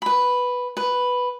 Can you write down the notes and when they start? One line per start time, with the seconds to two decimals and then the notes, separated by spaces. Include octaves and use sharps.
0.02 B4 B5
0.77 B4